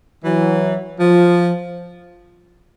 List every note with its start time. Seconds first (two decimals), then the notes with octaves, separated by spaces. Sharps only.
0.23 E3 F#3
0.99 F3